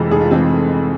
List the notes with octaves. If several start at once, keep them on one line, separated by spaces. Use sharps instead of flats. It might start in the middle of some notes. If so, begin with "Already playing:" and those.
Already playing: F1 F2 E3 G#3 A4
F1 G#4
F4
E3 G#3 C4